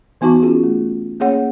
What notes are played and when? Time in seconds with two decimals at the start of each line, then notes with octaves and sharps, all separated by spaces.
0.21 E3 B3 D#4 F#4 A5 C#6
0.42 C#4 F4 F#4 G#4
0.64 A3
1.20 A#3 C#4 G#4 C#5 F#5